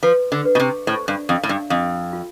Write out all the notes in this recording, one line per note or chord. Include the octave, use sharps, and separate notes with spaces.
F3 B4
D3
B4
B2
C3
A2 C5
G2
F2 F5
A2
G2
F2 F5
F4